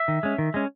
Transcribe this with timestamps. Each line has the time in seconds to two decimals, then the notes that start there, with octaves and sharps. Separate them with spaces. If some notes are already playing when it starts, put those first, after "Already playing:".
Already playing: E5
0.08 D#3
0.23 G#3 C#4
0.38 D#3
0.54 G#3 C#4